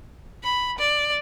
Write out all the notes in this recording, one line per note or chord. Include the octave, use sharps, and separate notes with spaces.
B5
D5